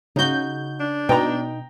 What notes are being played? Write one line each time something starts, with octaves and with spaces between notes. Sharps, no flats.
C#3 D#4 F#4 G6
D4
B2 D#4 G5 A#5